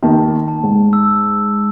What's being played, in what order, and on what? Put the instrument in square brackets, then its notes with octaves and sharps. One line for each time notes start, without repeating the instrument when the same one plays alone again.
[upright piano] D#2 D#3 [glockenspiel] A5
[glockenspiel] A5
[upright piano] G#2
[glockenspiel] E6